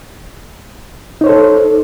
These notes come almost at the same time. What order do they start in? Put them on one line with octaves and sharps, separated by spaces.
D#4 C#5 C5 A4